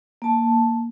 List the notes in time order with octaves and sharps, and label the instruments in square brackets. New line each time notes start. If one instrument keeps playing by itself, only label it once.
[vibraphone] A#3 A5